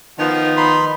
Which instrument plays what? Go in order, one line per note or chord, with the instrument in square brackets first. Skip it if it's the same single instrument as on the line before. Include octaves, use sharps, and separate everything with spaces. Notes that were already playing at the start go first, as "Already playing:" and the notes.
[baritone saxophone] D#3 [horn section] F3 B3 F4
[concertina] D#4 B5 C6